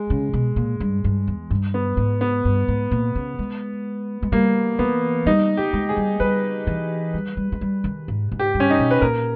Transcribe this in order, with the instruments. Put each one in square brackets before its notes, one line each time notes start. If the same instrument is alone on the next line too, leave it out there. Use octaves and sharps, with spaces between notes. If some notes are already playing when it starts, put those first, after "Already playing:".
Already playing: [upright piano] G#3
[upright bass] C#3
B2
A#2
G2
G2
E2
G2
[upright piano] B3
[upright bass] G#2
[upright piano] B3
[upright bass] G2
G#2
A#2
C#3
G#3
G#3
[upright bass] G3 [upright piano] A#3
[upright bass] E3 [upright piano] B3
[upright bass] G3 [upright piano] D#4
[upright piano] G4
[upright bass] G#3
[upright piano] G#4
[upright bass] G3
[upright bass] G3 [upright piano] B4
[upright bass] E3
G3
G3
G#3
G3
D#3
G#2
G#2
[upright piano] G4
[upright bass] G2
[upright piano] C#4
D#4
[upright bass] B2
[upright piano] B4
[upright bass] A#2 [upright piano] A#4